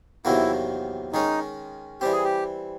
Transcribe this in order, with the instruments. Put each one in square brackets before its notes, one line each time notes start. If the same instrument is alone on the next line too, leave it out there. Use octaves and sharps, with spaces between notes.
[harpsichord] E2 C3 D#3 F#3 A#3 [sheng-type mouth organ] E4
[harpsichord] D#3 G#3 C#4 [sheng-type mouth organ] D#4
[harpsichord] E3 G3 C4 [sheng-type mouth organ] G4
[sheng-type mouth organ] G#4
G4